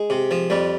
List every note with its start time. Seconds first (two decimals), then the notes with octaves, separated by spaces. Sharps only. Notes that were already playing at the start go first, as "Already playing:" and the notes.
Already playing: G#3
0.10 C3
0.31 F3
0.50 F2 G3